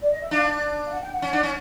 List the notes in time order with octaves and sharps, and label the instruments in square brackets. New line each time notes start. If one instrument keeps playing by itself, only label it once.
[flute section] D5
D#5
E5
[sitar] D4 [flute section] F5
[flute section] F5
F#5
G5
F#5
[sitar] C#4
D4
C#4